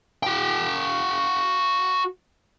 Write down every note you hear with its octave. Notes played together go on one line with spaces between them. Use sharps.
F#4 G5